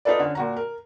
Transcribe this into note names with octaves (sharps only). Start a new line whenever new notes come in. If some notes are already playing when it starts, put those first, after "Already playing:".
D#4 F4 A4 B4 D5
D3 C#4
A#2 F#4 A#5
A#4